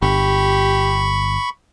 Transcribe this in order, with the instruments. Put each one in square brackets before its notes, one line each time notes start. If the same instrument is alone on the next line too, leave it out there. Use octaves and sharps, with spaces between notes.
[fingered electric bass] G1 [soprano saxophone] G4 [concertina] B5 C#6